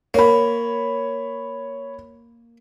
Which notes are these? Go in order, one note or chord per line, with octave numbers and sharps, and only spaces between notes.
A#3 C#5 B5